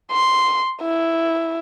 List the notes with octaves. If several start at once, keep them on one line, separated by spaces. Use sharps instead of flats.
C6
E4